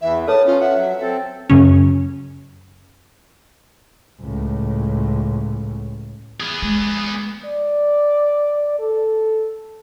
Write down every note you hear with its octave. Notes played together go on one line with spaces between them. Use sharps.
E2 E3 E5
A4 B4 C#5 A5 D#6
C#4 F4
E5 F#5
F#3
C4 A4
F#2 C#3 C#4
C#2 A2
B3 G#4
G#3
D5
A4